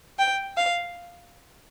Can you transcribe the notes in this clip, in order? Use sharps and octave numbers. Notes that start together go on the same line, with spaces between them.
G5
F5